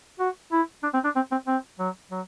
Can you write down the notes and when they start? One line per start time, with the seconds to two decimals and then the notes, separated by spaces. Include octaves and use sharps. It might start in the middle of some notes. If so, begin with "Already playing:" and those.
0.19 F#4
0.52 E4
0.83 D4
0.94 C4
1.04 D4
1.16 C4
1.32 C4
1.47 C4
1.79 F#3
2.11 F#3